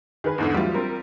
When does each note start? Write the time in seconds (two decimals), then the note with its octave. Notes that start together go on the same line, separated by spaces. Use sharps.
0.24 D#3 G#4 B4 G#5
0.38 E2 G#2 D3
0.54 E3 F#3 G3 A3 F4
0.74 C4 A#4